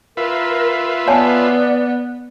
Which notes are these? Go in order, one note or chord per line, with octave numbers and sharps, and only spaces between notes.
F4 A#4 B4 E5
B3 C#5 D5 G#5 A5